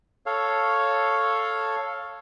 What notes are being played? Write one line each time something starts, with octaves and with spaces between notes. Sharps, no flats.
A4 C#5 F5